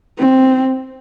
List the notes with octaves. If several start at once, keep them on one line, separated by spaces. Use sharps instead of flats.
C4